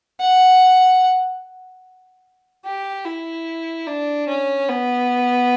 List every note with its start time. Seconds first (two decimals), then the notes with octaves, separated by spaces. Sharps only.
0.21 F#5
2.65 G4
3.06 E4
3.87 D4
4.28 C#4
4.69 B3